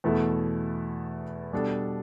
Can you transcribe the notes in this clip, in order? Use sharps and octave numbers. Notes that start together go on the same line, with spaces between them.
E2 B2 A3 E4 A4
B2 G3 D4 A4